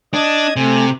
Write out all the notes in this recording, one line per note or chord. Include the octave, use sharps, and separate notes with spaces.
D4 D#5 D#6 G#6
C3 A3 G#5